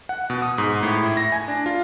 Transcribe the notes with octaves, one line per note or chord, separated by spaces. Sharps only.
F#5
B2
D#6
G#2
A2
E4
A#6
G#5
D4
F4